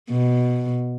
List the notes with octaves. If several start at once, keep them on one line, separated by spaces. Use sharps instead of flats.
B2